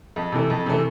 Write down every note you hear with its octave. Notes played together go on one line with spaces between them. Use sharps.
F2
C3 E3 A3
F2
C3 E3 A3